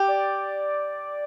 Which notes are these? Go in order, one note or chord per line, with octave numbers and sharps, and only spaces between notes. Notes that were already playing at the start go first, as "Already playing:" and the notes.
Already playing: G4
D5